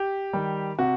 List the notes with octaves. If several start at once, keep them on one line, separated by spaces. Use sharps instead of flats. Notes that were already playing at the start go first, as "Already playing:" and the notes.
Already playing: G4
D#3 G3
C3 F#4